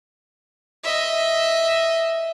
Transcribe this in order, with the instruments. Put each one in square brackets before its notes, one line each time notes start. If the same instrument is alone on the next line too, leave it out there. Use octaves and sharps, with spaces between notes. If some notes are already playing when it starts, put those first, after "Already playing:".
[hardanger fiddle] D#5 E5